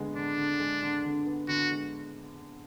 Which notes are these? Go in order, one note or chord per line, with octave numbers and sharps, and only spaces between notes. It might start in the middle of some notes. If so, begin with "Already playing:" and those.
Already playing: D3 G#3 B3
D3 D4
D3
G#3
D3
D3
B3
D3 F#4
G#3